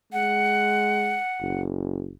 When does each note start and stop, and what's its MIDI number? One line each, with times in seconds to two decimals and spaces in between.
0.13 1.18 56
0.13 1.61 78
1.41 2.12 30